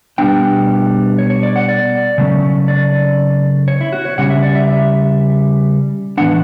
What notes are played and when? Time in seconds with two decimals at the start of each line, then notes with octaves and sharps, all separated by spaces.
0.18 B2 G3 B3 D4 G5
1.18 C#5
1.30 C#5
1.43 D5
1.56 F#5
1.69 D5
2.18 C#3 F#3 A3 C#4
2.68 D5
3.68 C#5
3.81 E4
3.93 F#4
4.05 C#5
4.18 C#3 G3 C#4 F#5
4.30 E5
4.42 D5
4.55 E5
4.68 E5
6.17 A2 E3 B3 D4 F#5